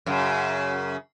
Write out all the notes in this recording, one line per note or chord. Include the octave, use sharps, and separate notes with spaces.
F#2 C#3